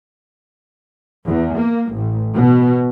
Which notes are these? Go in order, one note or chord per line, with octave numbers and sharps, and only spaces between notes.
E2
A#3
A1
B2